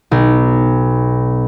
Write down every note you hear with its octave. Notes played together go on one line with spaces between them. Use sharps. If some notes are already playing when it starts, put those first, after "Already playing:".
B1